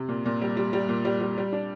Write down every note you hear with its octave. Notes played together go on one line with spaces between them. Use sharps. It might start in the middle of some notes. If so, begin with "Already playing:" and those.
Already playing: C3
A#2
A#2
G3
G3
G3
A#2
G3
G3
G3
D4